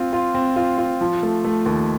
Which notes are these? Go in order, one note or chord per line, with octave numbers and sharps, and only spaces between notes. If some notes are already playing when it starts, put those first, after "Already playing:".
Already playing: C4 F4
F4
C4
F4
F4
F3
A3
A3
D#2